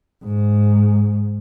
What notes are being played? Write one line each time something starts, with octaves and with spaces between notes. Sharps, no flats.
G#2